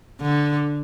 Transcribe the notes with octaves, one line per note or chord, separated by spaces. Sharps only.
D3